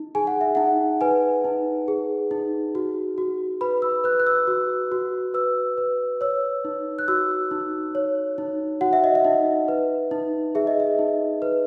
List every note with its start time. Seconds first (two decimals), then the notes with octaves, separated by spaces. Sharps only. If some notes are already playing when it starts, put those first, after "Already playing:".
Already playing: D#4
0.15 G#4 G#5
0.27 F#5
0.41 E5
0.55 D#4 F#5
1.01 B4 G#5
1.44 D#4
1.88 G#4
2.31 D#4
2.75 F#4
3.18 F#4
3.61 B4 B5
3.82 E6
4.04 B4 F#6
4.20 F#6
4.27 E6
4.47 F#4
4.92 F#4
5.34 B4 E6
5.78 B4
6.21 C#5 E6
6.65 D#4
6.99 F#6
7.08 F#4 E6
7.51 D#4
7.95 C#5
8.38 D#4
8.81 F#4 F#5
8.93 E5
9.04 D#5
9.15 E5
9.25 D#4
9.68 B4
10.11 D#4
10.55 G#4 E5
10.67 D#5
10.80 E5
10.99 D#4
11.42 B4